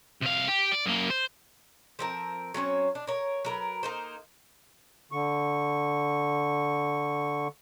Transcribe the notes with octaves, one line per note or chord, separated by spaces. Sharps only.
C2 F5
G4
D5
F#2 A#3
C5
F3 C4 A#4
F#3 C4 C#4 C#5
D4
A#4 C#5
F#3 A#4 B4
A#3 D#4 C5
D3 C#6